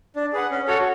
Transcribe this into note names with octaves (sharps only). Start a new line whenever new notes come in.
D4
G#4 B4 F#5
C#4
F#4 A4 C#5